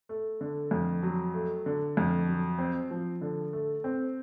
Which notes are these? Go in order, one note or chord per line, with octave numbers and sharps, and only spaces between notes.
A3
D3
F2
F#3
A3
D3
F2
F#3
C4
F3
D3
A3
C4